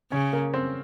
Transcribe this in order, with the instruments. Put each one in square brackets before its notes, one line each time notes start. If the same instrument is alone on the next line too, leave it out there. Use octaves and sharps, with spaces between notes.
[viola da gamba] C#3 [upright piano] C#4 C#5
[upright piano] A#3 A#4
C4 C5